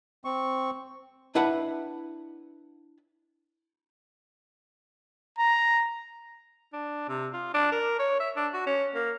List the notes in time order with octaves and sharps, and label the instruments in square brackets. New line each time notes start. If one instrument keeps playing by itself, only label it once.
[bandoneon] C4 C#6
[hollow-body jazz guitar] D4 E4 B4 E5 F#5 B5
[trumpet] A#5
[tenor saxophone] D4
C3
F4
D4
A#4
C#5
E5
D4
F#4
C#4
A#3